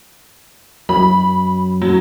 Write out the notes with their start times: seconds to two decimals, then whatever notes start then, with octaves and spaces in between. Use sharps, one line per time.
0.89 F#2 B5
1.82 F#3